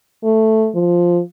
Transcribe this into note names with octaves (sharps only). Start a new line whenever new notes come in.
A3
F3